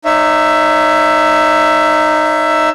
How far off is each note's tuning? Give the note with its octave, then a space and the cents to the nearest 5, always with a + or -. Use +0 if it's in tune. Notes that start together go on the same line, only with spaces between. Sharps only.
D#4 -10 C#5 +0 E5 +15